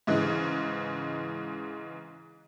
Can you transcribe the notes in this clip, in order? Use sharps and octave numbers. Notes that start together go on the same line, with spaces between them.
G#2 C#3 E3 G#3